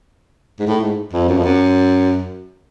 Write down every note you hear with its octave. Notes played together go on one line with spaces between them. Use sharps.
G#2
A2
G#2
F2
F#2
F2
F#2